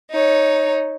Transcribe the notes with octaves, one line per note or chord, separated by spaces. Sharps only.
D#4 C#5